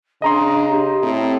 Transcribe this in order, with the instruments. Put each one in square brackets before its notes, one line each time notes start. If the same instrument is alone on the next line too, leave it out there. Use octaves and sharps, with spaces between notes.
[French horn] C#3 [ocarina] D4 [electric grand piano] D#5 A#5 C6
[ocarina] G4
[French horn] A2 [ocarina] C4